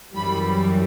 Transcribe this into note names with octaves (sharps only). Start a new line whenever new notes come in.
F#2 E3 G3 B5